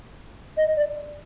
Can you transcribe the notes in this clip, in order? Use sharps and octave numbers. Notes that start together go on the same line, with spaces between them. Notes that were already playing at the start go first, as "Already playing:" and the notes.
D#5
D5